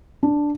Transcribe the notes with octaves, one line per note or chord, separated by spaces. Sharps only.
D4